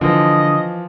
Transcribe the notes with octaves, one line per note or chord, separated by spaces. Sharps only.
D3 E3 F3 D#5